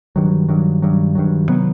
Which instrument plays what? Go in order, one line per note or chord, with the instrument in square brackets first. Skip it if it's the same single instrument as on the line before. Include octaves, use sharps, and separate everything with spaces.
[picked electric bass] G2 D#3 F#3
G2 D#3 F#3
G2 D#3 F#3
G2 D#3 F#3
C3 D#3 F#3 B3